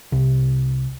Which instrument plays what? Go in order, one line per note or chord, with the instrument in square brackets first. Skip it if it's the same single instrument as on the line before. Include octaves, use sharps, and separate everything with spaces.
[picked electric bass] C2